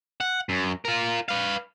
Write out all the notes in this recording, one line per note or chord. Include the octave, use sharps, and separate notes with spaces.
F#5
F#2
F4 A#4
B4 F5